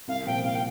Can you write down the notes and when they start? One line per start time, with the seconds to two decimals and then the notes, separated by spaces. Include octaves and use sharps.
0.08 C2 F5
0.26 A#2 F3 G5
0.44 C2 F5
0.55 G5